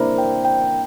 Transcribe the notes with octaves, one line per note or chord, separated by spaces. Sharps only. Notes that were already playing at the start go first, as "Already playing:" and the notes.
Already playing: A#3 D4 E4 A#4 C5
G5
G5